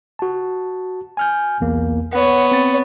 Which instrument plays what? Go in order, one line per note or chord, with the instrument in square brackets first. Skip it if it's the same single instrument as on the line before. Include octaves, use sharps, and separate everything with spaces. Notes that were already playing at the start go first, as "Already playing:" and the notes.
[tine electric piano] F#4 A5
G#5 F6 G6
B1 E2 A#3
[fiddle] B3 C#5 [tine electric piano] F#5
[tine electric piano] C4 A6